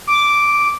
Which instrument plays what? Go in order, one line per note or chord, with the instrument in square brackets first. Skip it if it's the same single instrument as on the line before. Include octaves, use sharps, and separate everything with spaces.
[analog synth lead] D6